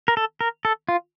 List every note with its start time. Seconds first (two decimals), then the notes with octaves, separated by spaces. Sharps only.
0.08 A#4
0.17 A4
0.41 A#4
0.65 A4
0.89 F4